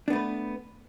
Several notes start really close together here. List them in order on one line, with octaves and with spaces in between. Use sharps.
D4 B3 A3 B4